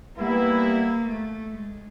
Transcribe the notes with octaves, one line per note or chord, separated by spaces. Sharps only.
G3 A#3 B3 E4
A3
G#3